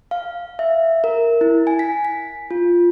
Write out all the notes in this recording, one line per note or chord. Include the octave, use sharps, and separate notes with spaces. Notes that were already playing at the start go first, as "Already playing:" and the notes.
F5
E5
A#4
E4
G#5
B6
B6
F4